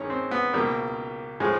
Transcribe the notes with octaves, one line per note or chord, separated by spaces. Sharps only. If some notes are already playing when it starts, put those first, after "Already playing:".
Already playing: G2 D#3 G#3 C#4 D#4
C4
B3
C#2 B2 G3 A#3
A2 F3 G#3